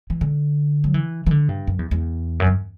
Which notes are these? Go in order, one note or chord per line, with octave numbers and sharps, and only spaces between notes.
E3
D3
F#3
E3
E3
D3
G2
F#2
E2
E2
F#2
G2